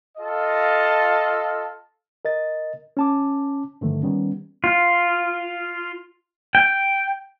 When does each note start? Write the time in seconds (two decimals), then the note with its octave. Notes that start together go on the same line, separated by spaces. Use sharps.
0.18 F4 A4 D#5 F5 A5
2.25 A#4 D#5 A6
2.97 C#4 A5 D6
3.81 G2 D3 D#3 F3 A3
4.03 D#3 G3 B3 C#4
4.64 F4
6.55 G5